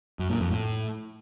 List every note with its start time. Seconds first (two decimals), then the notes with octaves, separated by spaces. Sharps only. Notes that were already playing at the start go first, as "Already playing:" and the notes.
0.19 F#2
0.30 A#2
0.40 F2
0.51 A2